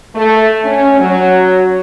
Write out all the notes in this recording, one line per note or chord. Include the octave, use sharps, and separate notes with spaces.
A3
C#4
F#3